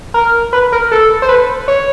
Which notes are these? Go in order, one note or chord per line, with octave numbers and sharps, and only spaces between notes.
A#4
B4
A#4
A4
C5
B4
C#5